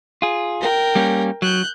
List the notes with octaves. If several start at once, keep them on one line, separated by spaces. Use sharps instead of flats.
F4 G#4
A#4 G5
G3 A#3 C#4
F#3 F#6 G6